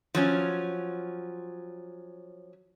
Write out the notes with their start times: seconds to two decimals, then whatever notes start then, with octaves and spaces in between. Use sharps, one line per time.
0.15 F3 F#3 C#4